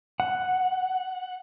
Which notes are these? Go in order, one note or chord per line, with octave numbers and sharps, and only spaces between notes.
F#5